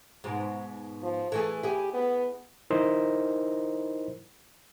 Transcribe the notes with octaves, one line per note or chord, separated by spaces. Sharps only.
G#2 B2
F3
E3 A3 G#4 A4
E4 G4 G#4
B3
D#4 E4 A#4 C5 D#5